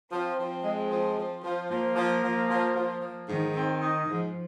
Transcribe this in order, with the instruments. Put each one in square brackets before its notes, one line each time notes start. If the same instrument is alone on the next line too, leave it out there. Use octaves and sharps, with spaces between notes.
[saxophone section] F3 [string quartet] C4
[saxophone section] F3
G#3
F3
F3
F3
[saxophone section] F3 [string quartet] A#3
[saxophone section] F3
F3
F3
F3
F3
[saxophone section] G#2 [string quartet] D#3
[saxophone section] C4
D#4
[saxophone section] G#2 [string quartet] F3